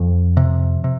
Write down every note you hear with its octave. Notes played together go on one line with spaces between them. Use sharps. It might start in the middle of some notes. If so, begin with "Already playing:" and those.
Already playing: F2 F3
C3
C3